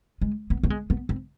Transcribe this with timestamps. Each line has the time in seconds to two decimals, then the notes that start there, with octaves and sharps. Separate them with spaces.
0.21 G#3
0.50 B3
0.63 B3
0.70 G#3
0.90 B3
1.09 C4